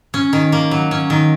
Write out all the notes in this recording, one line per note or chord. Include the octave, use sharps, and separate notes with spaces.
C#4
D#3
A#3
F#3
C#4
D#3